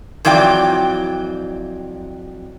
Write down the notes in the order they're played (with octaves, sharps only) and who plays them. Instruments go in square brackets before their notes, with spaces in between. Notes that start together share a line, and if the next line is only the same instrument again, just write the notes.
[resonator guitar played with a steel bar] F2 E3 F#3 D5 G5